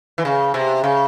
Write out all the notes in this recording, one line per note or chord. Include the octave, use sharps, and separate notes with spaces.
E3
C#3
C3
C#3